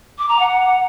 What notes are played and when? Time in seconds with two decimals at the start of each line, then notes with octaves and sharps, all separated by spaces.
0.19 D6
0.29 A#5
0.39 F#5